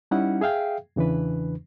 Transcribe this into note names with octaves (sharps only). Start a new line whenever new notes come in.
G3 C#4 D#4 E4 F#5
G#4 E5 F5 G5
E2 C#3 E3 D4 B4